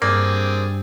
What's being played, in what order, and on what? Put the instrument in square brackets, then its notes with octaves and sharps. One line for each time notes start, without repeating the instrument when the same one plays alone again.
[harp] G2 [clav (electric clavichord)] A#3 [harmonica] C4 G#4 [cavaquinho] D5